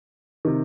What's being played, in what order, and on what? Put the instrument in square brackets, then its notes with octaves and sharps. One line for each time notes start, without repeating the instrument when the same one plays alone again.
[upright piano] C3 D#3